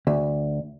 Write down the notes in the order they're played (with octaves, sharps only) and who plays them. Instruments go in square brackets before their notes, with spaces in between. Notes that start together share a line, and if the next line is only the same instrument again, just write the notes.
[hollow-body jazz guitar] D2